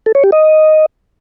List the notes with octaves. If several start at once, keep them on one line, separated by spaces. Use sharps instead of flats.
A4
C#5
G4
D#5